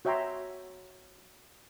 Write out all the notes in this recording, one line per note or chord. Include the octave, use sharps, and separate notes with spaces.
F#4 C#5 E5 G5 A#5 C6